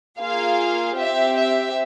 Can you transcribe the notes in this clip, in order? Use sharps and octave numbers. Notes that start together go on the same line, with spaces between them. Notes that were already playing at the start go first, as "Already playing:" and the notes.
A#3 F4 G#4 F5
C4 G4 E5
E5